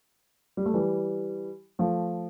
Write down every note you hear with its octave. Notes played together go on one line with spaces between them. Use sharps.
G3
A3
E3 G3
F3 A3